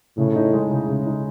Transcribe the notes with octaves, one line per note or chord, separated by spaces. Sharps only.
A2 C#3
D#4
G#3
C#3
C#3
D#4